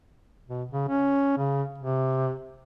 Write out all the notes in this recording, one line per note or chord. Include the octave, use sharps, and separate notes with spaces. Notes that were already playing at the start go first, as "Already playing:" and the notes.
B2
C#3
C#4
C#3
C3